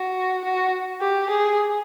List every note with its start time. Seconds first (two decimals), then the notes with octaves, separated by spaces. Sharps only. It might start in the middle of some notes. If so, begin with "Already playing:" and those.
Already playing: F#4
0.44 F#4
1.01 G4
1.30 G#4